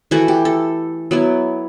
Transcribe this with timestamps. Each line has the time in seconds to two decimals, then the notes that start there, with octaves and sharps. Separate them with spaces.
0.11 E3 A3 E4 F#4
0.28 G4
0.45 A4
1.11 F#3 B3 E4